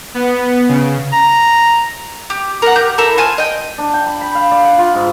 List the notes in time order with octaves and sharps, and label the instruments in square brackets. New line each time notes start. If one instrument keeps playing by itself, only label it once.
[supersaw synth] B3
C#3
[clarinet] A#5
[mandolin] G4
A#4 F#5
G4 G6
E4 A4 A#4
F4 C5 G#5 A5
D#5 G5
[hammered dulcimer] D4
G5
B5
B5
F5
D5
F#5
F4
G#2